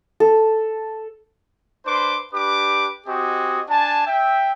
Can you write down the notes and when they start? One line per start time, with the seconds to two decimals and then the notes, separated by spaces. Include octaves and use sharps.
0.20 A4
1.85 D4 B4 C5 C6 D6
2.33 D4 G4 B4 D6
3.06 C4 F#4 G4 D#5 G#5
3.69 D4 G#5 A5
4.06 E5 G5